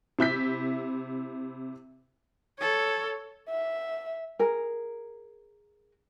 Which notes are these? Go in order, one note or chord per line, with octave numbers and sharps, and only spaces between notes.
C3 E4 G6 B6
A4 C#5
E5
G#4 A#4